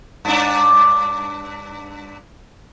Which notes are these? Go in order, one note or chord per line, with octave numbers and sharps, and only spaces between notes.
G2 D4